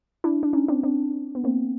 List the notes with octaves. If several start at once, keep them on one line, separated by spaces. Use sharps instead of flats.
D4 E4
D4
C#4 D#4
C4 D4
C4 D4
B3
A#3 C4